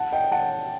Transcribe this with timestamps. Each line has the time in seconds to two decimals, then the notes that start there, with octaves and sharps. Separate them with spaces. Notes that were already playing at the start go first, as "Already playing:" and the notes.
Already playing: F#5 A5
0.12 D#5 G5
0.32 F#5 A5